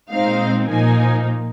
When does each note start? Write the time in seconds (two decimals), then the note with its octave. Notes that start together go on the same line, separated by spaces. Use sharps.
0.10 A#2 G#3 C4 D#4 F5
0.68 A#2 F3 A#3 D#4 G#5